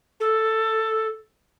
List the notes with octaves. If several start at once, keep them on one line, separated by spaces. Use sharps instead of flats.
A4